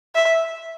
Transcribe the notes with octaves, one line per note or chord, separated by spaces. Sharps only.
E5